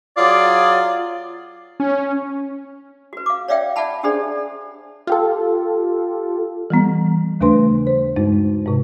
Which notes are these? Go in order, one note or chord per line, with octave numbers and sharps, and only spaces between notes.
F#3 F4 G#4 D5
C#4
F#4 B4
F5 D6
C#5 D5 E5 F5 G5
D5 E5 F#5 A5 B5
D4 G4 G#4 C5 D5
F4 G4 A4
E3 G3 B3
D#2 C#3 A3 D4 B4 C6
C5
G2 G#3 D#4
G#2 C3